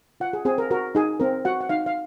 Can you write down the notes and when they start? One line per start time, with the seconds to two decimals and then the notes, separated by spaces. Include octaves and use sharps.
0.20 F4 F#5
0.33 G#4
0.45 C4 G#4
0.58 A#4
0.71 F#4 A#4
0.95 D#4 G#4
1.20 C4 A#4
1.45 F#4 F#5
1.61 F#5
1.69 D#4 F5
1.86 F5